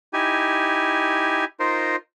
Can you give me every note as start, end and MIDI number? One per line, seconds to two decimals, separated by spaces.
0.13 1.45 63
0.13 1.45 64
0.13 1.45 67
0.13 1.45 80
1.60 1.96 63
1.60 1.96 65
1.60 1.96 70
1.60 1.96 72